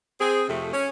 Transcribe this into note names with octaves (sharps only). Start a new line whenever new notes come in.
C4 G#4
F2 C3 A3
C#4